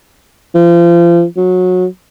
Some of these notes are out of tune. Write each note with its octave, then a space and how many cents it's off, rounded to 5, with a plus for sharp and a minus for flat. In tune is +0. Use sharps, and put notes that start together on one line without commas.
F3 -35
F#3 -20